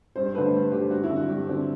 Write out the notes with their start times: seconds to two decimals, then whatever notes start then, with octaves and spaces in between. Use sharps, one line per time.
0.16 G2 C5
0.35 D3 F#3 A3 B4
0.53 G2
0.72 D3 F#3 A3 G4
0.91 G2 F#4
1.03 E4
1.10 D3 F#3 C4
1.16 F#4
1.28 G2 G4
1.47 D3 F#3 C4